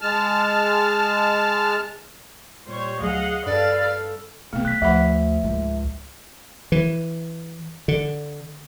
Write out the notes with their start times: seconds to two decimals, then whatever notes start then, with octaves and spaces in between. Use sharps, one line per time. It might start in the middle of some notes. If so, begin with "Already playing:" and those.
0.01 G#3 A5 F6
2.68 A#2 G3 C5 C#5
3.01 D2 F#3 G#4 D#5 F5 F#5
3.46 G2 A4 B4 D5 F5
3.85 A4
4.53 B2 F3 A3 B3
4.65 F#3 F#6 B6
4.82 D2 F3 A3 E5 F#5 B5
5.44 C#2 G#2
6.72 E3
7.88 D3